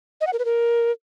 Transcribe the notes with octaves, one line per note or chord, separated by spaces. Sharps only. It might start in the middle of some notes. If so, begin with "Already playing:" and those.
D#5
F#5
A#4
B4
A#4